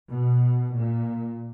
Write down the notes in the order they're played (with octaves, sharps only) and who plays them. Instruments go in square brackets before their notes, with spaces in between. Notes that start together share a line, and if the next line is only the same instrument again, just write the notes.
[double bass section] B2
A#2